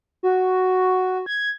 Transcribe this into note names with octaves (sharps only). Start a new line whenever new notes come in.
F#4
G#6